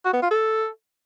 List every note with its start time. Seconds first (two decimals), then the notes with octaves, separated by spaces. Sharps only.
0.05 F#4
0.13 B3
0.22 F4
0.31 A4